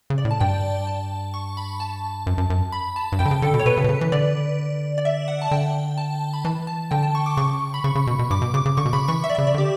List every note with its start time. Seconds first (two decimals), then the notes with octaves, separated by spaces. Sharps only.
0.10 C#3
0.18 D5
0.25 A2
0.31 A5
0.40 G2 G5
0.87 A5
1.34 C#6
1.57 B5
1.80 A5
2.27 F#2
2.38 F#2
2.50 F#2
2.72 B5
2.96 A5
3.12 G2
3.19 F#2 G5
3.25 D3
3.31 C#3
3.42 D3 A4
3.54 B2
3.60 C#5
3.66 B2 B4
3.77 C#3
3.84 B2
3.89 C#3
4.01 E3
4.12 D3 D5
4.98 D5
5.05 E5
5.28 F#5
5.42 A5
5.51 D3 G5
5.98 A5
6.33 B5
6.44 E3 A5
6.67 A5
6.91 D3 G5
7.03 A5
7.15 C#6
7.26 D6
7.37 C#3 C#6
7.74 B5
7.84 C#3 C#6
7.95 C#3
8.07 B2
8.19 B2
8.30 G2 D6
8.42 B2
8.54 C#3 D6
8.66 C#3
8.77 D3 C#6
8.85 B2
8.93 C#3 B5
9.08 E3 C#6
9.24 E5
9.30 D5
9.35 C#3 E5
9.47 D5
9.54 D3 G4